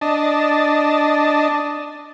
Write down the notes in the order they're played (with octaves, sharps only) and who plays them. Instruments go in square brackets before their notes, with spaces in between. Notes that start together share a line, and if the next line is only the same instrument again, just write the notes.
[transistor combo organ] D4 D#5 A5